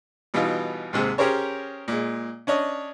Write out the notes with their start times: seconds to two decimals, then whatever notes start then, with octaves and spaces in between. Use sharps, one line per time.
0.34 B2 E3 G3 D#4 F4
0.93 D#2 G#2 C3 G#4
1.18 C#4 G4 G#4 A#4 C5 C#5
1.88 A#2 G#3
2.47 C#4 D4 C#5 D#5